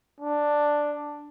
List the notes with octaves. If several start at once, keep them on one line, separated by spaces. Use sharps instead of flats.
D4